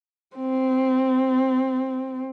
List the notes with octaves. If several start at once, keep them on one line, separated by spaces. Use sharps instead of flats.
C4